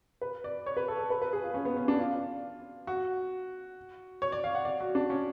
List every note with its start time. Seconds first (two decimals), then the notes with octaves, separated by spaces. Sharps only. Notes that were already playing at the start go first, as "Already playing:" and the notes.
0.22 B4
0.44 D5
0.66 C#5
0.77 B4
0.88 A4
0.99 A4
1.10 B4
1.22 B4
1.33 G#4
1.44 F4
1.54 C#4
1.65 B3
1.77 C#4
1.88 D4
2.00 F4
2.87 F#4
4.22 C#5
4.32 D5
4.44 F5
4.55 F#5
4.65 D5
4.81 F#4
4.95 D4
5.10 C#4